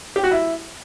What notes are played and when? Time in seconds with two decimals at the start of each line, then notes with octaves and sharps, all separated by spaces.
0.16 G4
0.23 F#4
0.31 E4